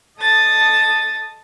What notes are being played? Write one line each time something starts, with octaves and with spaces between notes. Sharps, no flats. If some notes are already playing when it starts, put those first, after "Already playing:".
A4 D#5 A5 D#6 A6